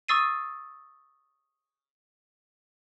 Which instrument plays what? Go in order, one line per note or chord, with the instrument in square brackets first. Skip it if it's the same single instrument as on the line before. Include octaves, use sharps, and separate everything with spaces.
[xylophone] C#6 D#6 E6 A6 C7 D#7